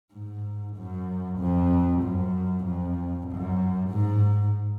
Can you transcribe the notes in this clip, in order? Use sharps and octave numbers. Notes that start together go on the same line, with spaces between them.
G#2
F#2
F2
F#2
F2
F#2
G#2